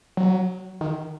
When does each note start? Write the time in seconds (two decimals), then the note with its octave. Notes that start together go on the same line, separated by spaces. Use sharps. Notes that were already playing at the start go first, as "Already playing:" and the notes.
0.17 F#3
0.81 D#3